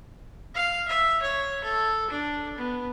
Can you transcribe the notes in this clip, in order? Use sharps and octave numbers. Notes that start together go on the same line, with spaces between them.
F5
E5
C#5
A4
D4
B3